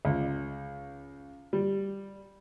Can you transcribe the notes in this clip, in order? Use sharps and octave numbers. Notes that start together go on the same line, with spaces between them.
C#2
G3